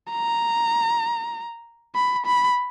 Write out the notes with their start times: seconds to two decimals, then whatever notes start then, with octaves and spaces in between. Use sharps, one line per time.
0.12 A#5
1.95 B5
2.26 B5